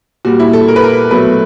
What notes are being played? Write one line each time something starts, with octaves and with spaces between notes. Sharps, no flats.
A#2 G3 F#4
E4
A4
A#4
B4
A#4
B2 F#3 A3 B4